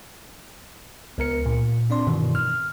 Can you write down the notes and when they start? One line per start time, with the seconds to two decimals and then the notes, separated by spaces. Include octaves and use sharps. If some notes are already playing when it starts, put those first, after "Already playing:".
1.18 C#2 B3 A#4 C#7
1.46 A#2
1.90 C4 D4 D5 C6
2.07 G2 B2 D#3 E3
2.35 F6